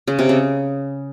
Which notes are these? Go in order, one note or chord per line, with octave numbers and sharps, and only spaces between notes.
C#3
C3
C#3